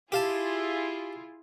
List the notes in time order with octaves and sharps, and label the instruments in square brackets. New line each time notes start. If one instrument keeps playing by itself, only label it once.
[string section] E4 F4 G#4 [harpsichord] G4 F5 A5